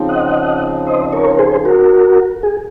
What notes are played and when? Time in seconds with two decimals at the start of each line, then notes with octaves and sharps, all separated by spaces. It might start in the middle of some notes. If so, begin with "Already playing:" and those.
Already playing: C#3 F3 C4 D#4
0.09 D#5 F#5
0.87 C5 D#5
1.12 A#4 C#5
1.31 A#4
1.39 G#4 C5
1.65 F#4 A#4
2.43 G#4